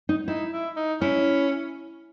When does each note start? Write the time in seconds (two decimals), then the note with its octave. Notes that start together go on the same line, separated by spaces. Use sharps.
0.09 D#4
0.28 D#4 E4
0.52 E4
0.77 D#4
1.01 C#4 E4